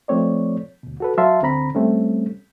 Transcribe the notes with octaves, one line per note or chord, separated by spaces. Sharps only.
F3 A3 C4 C#5 D5
D2 B2
F#4 A4 B4
F#3 E5 F5 A5 C6
D2 D3 C4 A#5 B5
G3 A3 C4 C#4